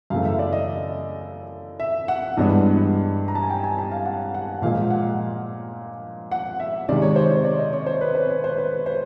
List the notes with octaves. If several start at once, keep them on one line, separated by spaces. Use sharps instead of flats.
F#2 C#3 E3 A3 F5
E5
D5
D#5
E5
F#5
G2 E3 G#3 B3 D4
A#5
A5
G#5
G5
G#5
A5
F5
F#5
F#5
A#2 F3 G#3 F5
F#5
F#5
E5
C3 D#3 G#3 C#4 D5
C#5
C5
C#5
D5
D#5
C#5
C5
B4
C5
C#5
C5
B4
C5